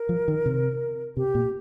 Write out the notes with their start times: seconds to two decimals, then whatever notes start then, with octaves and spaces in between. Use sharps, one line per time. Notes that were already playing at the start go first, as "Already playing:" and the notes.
Already playing: A#4
0.09 F3
0.28 D#3
0.46 C3
1.17 C3 G4
1.35 A#2